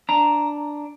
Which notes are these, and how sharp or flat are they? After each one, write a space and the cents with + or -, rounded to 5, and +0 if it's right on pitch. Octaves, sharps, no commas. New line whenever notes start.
D4 +0 A#5 +0